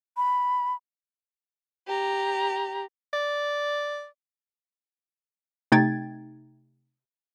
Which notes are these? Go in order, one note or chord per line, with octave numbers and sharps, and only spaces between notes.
B5
G4 A#5
D5
C3 A3 D#4 G5 G#6 A6